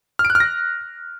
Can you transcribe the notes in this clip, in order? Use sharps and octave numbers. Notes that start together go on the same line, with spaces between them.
F6
D7
F#6
F6
A#6